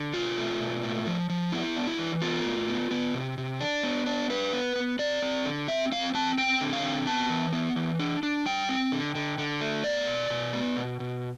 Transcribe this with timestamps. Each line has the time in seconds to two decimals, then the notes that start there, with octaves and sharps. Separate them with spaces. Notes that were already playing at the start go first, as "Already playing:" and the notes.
Already playing: D3
0.14 B2 F4
0.37 A3
0.60 B2
0.83 A2
1.07 F3
1.29 F3
1.52 B3 E4
1.76 D4
1.87 E4
1.98 E3
2.22 B3 F4
2.45 A2
2.68 B3
2.91 B3
3.14 C3
3.38 C3
3.61 D4
3.83 B3
4.06 D4
4.30 D4 B4
4.53 B3
4.76 B3
4.99 C4 D5
5.22 C4
5.45 D3
5.68 C4 E5
5.92 C4 F5
6.14 C4 A5
6.38 C4 G5
6.61 D3
6.73 F5
6.83 C4
7.07 B3 A5
7.30 E3
7.53 B3
7.76 E3
7.99 D4
8.23 D4
8.46 G3 G5
8.69 C4
8.92 D3
9.15 D3
9.38 D3
9.61 A3
9.84 B3 D5
10.07 B2
10.30 B2
10.53 B3
10.77 B2
11.00 B2